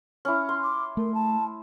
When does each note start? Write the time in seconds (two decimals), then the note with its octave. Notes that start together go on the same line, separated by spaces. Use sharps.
0.25 C#4 E4
0.49 C6
0.64 D6
0.97 A3 A#4
1.14 A5